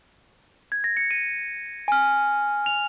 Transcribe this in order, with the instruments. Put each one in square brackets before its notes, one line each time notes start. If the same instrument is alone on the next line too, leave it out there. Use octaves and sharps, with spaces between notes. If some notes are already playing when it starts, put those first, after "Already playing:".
[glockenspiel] G#6
A#6
C#7
D#7
G#5 F6
F7